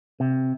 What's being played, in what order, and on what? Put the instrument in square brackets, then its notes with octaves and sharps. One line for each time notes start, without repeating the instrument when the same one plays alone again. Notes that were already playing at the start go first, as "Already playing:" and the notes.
[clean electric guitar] C3